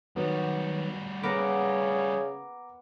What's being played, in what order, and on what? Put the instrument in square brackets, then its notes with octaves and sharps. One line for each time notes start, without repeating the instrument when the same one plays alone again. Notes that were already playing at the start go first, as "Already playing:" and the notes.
[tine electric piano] D#3 F#3 B3 [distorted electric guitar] G3 F#4
[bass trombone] C#3 [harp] B3 A#4 [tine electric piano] A#5 D6